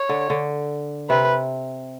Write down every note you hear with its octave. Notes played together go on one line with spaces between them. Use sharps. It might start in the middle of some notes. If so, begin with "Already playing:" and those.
Already playing: C#5
D3
D3
C3 B4